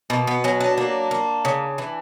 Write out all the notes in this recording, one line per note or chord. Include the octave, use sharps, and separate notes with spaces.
B2 A#3
B3
F#3 C#4
D4
A#3
A#3
C#3
E3